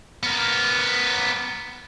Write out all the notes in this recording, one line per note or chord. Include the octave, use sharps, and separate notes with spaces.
B3 A#4